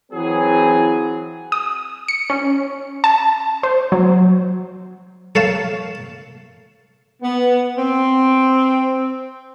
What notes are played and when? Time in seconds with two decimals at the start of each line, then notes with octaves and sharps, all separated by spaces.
0.12 E3 F#3 C4 G#4
1.52 D#6
2.08 C#7
2.30 C#4
3.04 A5
3.63 C5
3.92 F#3
5.35 A4 C#5 F5 A5
7.22 B3
7.78 C4